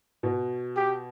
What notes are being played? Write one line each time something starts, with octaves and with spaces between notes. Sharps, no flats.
B2
G4